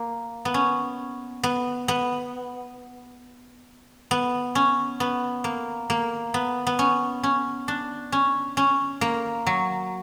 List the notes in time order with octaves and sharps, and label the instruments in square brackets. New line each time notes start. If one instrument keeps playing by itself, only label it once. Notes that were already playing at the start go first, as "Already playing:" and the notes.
Already playing: [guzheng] A#3
B3
C#4
B3
B3
B3
C#4
B3
A#3
A#3
B3
B3
C#4
C#4
D4
C#4
C#4
A#3
F#3